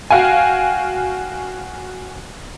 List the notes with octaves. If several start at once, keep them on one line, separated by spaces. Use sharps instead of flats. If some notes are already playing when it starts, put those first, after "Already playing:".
F#4 F5 G5 G#5